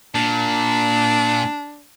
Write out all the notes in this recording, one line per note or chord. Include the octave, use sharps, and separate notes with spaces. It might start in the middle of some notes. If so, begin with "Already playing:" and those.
A#2 D4